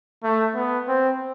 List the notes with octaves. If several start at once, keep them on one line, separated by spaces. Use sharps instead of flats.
A3
B3
C4